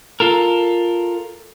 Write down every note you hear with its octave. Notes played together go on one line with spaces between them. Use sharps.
F4 A4 A#4